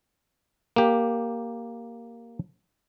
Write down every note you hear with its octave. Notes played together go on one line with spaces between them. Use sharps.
A#3 G4